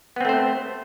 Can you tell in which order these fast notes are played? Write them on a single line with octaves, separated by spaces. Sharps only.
B3 C4 A3 C5